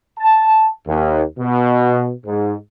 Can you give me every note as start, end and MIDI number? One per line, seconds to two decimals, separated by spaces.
0.19 0.67 81
0.87 1.22 39
1.39 2.12 47
2.26 2.54 44